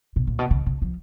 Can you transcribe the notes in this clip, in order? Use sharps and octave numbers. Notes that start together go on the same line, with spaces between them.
B2
A#2
B2
C#3
C#3
F3